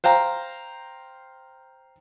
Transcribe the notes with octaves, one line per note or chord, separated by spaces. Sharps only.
C5 F5 G5 A#5